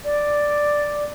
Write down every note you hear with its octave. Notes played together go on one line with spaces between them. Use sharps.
D5